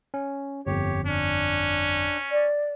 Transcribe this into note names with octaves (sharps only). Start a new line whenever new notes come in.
C#4
G1 F2 G4 C#5
C#4 D4
D5